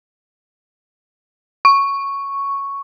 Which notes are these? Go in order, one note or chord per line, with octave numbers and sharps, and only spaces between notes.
C#6